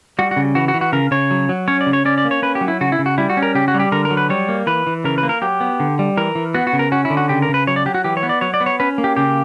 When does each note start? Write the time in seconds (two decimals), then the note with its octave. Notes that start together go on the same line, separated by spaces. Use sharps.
0.19 G3 F#4
0.31 F#4
0.36 C#3
0.55 E3 F#4
0.68 F#4
0.74 E3
0.81 F#4
0.92 C#3 A#4
1.11 C#3 C#5
1.31 F#3
1.49 F#3
1.68 C#4 C#5
1.81 D5
1.86 C#3
1.93 C#5
2.05 C#4 D5
2.18 D5
2.25 A#3
2.31 C#5
2.42 C#4 B4
2.55 G4
2.61 F#3
2.68 E4
2.81 C#3 F#4
2.92 E4
2.99 C#3
3.06 F#4
3.18 G3 E4
3.30 F#4
3.37 C#4
3.43 A#4
3.55 C#3 G4
3.68 F#4
3.74 G3
3.80 G4
3.92 D3 A#4
4.05 A#4
4.11 F#3
4.17 B4
4.30 G3 C#5
4.49 A#3
4.67 E3 B4
4.87 E3
5.04 C#3 A#4
5.18 B4
5.23 A#3
5.29 A#4
5.42 F#3 G4
5.60 B3
5.80 D3
5.99 G3
6.17 E3 A#4
6.35 E3
6.54 B3 F#4
6.67 F#4
6.73 C#3
6.79 A#4
6.92 C#4 F#4
7.05 E4
7.10 D3
7.17 F#4
7.29 C#3 G4
7.42 A#4
7.49 C#3
7.54 B4
7.67 F#3 C#5
7.76 D5
7.86 F#3 G4
7.94 F#4
8.04 E3 G4
8.17 C#5
8.23 B3
8.29 D5
8.41 F#3 C#5
8.54 D5
8.61 B3
8.66 C#5
8.80 C#4 B4
8.98 A#3
9.04 G4
9.17 C#3 G4